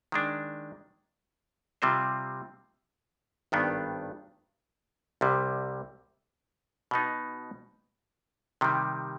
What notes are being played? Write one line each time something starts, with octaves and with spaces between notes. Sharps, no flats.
D#3 G#3 D4
C3 G3 C4 F4 C5
G#1 G2 D#3 B3 D4
C2 C3 G3
B2 B3 D#4
C3 D#3 G3